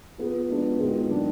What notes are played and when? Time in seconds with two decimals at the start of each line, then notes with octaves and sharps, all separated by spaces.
0.18 F3 B3 F4 G#4
0.49 F3 G#3 B3 D4 F#4
0.79 D#3 G#3 B3 F4 G#4
1.10 D#3 F#3 D4